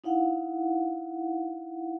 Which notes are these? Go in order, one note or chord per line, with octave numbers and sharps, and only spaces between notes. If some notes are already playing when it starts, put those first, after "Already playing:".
D#4 E4 F5 F#5